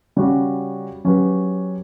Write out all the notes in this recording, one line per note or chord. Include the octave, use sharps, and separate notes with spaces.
C#3 G3 C#4 F#4
F#3 C#4 G4 B4